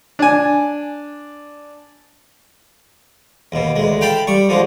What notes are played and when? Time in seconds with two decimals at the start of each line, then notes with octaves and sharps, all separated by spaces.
0.19 D4 G#5
3.52 D#2 B2
3.76 D2 G#3
4.01 F5 G5 A5 B5
4.27 G3 C#6
4.49 D3 F3 G#3